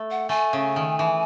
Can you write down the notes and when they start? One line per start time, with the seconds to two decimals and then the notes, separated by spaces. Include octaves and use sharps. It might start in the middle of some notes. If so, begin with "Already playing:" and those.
Already playing: A3
0.11 F#5
0.29 A3 G#5
0.53 C#3
0.76 D#3
0.99 E3